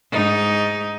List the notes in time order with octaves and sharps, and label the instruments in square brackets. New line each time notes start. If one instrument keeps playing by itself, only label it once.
[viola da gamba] G#2 D#4